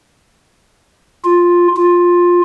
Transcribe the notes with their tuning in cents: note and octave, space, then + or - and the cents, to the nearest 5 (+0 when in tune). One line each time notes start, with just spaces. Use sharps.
F4 +5
F4 +10